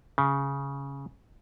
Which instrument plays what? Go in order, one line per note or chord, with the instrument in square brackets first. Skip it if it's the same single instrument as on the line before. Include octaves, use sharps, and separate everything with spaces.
[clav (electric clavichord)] C#3